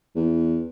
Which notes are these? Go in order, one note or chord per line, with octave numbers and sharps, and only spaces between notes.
E2